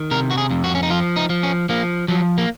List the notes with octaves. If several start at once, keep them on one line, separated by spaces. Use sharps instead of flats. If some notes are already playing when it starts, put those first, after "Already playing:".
Already playing: D#3
C3 A#4
F#4
G#4
F2
F#4
C#4
D#4
F3 F4
D#4
F3
C#4
F3 A#3
F3 F#3
A#3